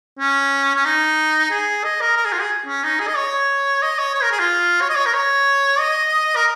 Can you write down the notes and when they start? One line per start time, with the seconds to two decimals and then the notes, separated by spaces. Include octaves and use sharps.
0.19 C#4
0.76 C#4
0.85 D#4
1.51 G#4
1.84 D#5
2.01 A#4
2.17 A#4
2.25 G#4
2.33 F4
2.40 G#4
2.66 C#4
2.84 D#4
3.00 G#4
3.08 D#5
3.17 C#5
3.83 D#5
3.99 C#5
4.15 C#5
4.23 A#4
4.32 G#4
4.39 F4
4.81 C#5
4.89 D#5
4.97 C#5
5.06 A#4
5.14 C#5
5.80 D#5
6.36 A#4